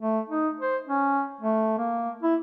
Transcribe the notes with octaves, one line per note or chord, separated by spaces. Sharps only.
A3
D#4
C5
C#4
A3
A#3
E4